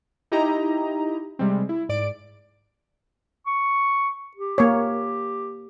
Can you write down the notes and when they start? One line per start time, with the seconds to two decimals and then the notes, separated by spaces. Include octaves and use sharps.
0.32 D#4 E4 G4 D#5 A#5
1.39 C3 G3 G#3 C4
1.69 E4
1.89 G#2 D5 D7
3.47 C#6
4.36 G4
4.58 A#3 C#5